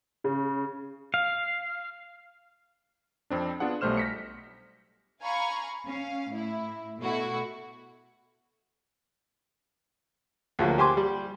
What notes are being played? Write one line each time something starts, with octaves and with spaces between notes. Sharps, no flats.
C#3
F5
F2 C4 D4
B3 D4 F4 G#4 F#5
B1 G3 A3 C5 F6 E7
A#6 B6 C#7
F5 G#5 A#5 B5 C#6
C#4 F5
A2 E4
B2 A3 E4 F#4
D2 F3 F#3 A#3
G4 C5 G#5 C6 D6
G3